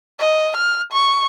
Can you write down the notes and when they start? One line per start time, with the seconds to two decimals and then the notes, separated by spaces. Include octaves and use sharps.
0.20 D#5
0.57 F6
0.93 C#6